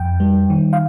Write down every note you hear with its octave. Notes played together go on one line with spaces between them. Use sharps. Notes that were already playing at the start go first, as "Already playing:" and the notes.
Already playing: F2 G5
G3
D#3
F5